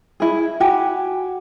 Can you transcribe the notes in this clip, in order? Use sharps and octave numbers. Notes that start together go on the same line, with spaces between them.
E4 G#4
F#4 G4 G#5